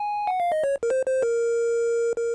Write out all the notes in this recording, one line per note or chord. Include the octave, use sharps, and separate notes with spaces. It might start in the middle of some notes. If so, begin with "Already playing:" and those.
Already playing: G#5
F#5
F5
D#5
C#5
A#4
C5
C5
A#4
A#4